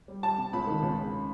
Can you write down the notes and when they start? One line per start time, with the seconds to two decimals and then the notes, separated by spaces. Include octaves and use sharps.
0.08 G3
0.23 G3 A5
0.38 C3
0.53 C#2 B5
0.67 D#3
0.82 C#2
0.97 C#3